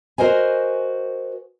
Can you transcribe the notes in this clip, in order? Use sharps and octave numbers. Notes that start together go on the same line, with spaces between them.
F#4 A#4 C5 D#5 G#5